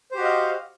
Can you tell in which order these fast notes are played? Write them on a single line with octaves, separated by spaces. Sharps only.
C5 G4 F#4 D#5 F5